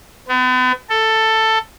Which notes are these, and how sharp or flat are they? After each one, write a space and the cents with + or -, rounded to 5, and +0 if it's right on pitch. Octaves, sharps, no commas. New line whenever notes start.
B3 +40
A4 +10